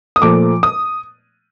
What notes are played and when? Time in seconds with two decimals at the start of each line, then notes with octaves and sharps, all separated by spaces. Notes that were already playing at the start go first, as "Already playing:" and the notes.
0.16 D#6
0.22 A#2 F3 A3 D6
0.63 D#6